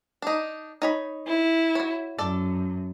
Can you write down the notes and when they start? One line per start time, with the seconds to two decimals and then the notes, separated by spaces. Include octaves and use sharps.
0.22 D4 D#4
0.82 D#4 C#5 B5
1.26 E4
1.75 F#4 C#5
2.19 F#2 A4 D5